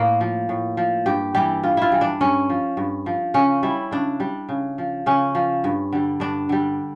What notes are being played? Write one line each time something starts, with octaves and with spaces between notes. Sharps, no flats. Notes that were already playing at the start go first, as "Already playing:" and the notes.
Already playing: A2 A#3
F3
A2
F3
G2 G4
E3 G3 G4
G2 F4
E4 F4
E3 G3
D4
G2 C#4
F3
G2
F3
C#3 C#4
G3 E4
C#3 D4
G3
C#3
F3
C#3 C#4
F3
G2
D3 G3
G2 D4
D3 G3